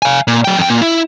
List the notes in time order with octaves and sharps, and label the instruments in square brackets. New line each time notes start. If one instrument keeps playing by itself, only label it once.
[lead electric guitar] F5 G#5
A#2
F#3 G5
F2 G5
A#2
E4